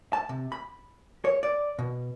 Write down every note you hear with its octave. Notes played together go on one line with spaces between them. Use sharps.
A5
C3
B5
C#5
D5
B2